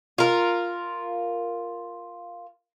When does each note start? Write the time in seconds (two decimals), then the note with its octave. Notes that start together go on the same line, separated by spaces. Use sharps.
0.18 F4 A#4